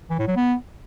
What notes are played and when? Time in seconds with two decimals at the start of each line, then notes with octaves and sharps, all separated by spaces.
0.10 E3
0.19 A2
0.28 F#3
0.36 B3